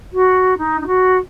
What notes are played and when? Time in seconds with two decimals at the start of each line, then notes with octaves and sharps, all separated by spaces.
0.13 F#4
0.58 D#4
0.81 D#4
0.87 F#4